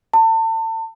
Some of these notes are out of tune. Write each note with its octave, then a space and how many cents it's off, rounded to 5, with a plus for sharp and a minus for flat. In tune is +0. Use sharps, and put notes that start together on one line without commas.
A5 +35